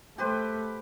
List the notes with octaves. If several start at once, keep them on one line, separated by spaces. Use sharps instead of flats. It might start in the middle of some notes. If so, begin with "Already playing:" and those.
A3 G4 B4 C5